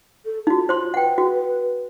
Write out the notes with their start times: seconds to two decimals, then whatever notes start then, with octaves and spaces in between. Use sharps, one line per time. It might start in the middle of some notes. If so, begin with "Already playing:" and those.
0.25 A4
0.47 D#4 F4 F#4
0.69 C5 C6
0.94 B4 F#5 G5
1.18 F#4